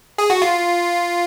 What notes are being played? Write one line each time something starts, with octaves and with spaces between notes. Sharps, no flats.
G#4
F#4
F4